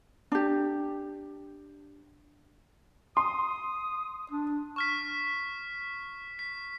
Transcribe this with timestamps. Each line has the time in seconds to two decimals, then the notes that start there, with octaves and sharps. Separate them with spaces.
0.32 D4 G4
3.17 C6 D#6
4.31 D4
4.76 C#6 F6 B6
6.39 B6